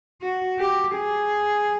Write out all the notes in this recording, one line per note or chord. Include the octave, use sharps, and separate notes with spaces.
F#4
G4
G#4